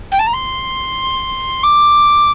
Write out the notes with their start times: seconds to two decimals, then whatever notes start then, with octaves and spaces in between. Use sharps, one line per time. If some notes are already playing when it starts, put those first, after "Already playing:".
0.11 G5
0.19 A5
0.27 A#5
0.33 C6
1.63 D6